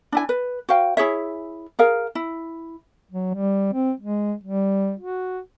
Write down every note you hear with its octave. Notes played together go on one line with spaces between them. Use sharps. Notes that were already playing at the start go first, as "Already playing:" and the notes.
D4 E4 G#5
B4
F#4 C5 F5 G5
E4 G#4 C#5 E5
G#4 A#4 F5
E4
F#3
G3
C4
G#3
G3
F#4